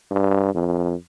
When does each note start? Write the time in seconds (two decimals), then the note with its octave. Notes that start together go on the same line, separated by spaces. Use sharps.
0.11 G2
0.54 F2